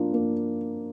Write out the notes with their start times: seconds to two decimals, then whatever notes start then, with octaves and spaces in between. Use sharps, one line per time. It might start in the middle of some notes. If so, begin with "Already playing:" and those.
Already playing: F3 A#3 D4 F4
0.13 A#3